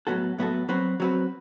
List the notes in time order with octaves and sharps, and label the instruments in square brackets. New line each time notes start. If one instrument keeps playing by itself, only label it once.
[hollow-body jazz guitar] A2 F#3 B3 F#4 A4
A2 F#3 B3 F#4 A4
F#3 C4 F#4 B4
F#3 C4 F#4 B4